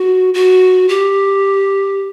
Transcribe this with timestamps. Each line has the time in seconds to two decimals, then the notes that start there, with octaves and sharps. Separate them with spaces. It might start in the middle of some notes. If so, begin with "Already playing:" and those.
Already playing: F#4
0.34 F#4
0.89 G4